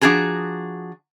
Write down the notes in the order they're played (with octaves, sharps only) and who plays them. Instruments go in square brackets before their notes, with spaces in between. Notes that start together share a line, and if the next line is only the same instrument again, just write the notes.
[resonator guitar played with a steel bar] F3 D4 F#4 G#4 A#5